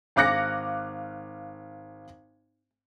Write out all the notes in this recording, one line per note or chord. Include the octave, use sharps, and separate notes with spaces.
G#1 F5 D6 F#6 A#6 C#7